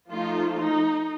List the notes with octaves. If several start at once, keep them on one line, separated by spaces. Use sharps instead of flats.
F3 A3 D#4 F4
D#4